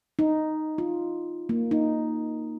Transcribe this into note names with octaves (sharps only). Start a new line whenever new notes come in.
D#4
F4
A#3
D#4